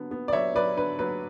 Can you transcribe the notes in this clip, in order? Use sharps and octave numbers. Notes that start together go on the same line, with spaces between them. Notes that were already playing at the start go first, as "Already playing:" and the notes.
Already playing: D3 F#3 B3
B3
D5
F#3 C#5 E5
F#3 B4 D5
D3 B4
F#3 B4